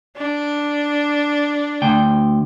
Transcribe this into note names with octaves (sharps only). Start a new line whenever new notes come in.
D4
D2 G5